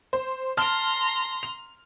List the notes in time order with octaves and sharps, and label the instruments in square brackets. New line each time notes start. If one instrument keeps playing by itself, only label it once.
[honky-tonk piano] C5
[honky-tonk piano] A5 F6 [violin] A#5 C6
[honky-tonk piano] F7